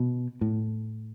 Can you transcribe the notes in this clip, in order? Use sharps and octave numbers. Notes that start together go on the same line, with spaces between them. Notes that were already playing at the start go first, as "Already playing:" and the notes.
Already playing: B2
A2